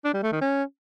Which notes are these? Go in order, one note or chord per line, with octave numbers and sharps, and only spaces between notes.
D4
G3
A3
D#3
C#4